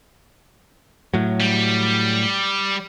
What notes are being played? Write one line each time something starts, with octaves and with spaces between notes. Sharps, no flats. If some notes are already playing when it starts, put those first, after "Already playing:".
A2 F#3
G3